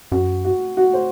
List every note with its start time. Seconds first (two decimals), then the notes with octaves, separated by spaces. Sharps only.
0.11 F#2 F#4
0.45 F#4
0.77 F#4
0.93 C5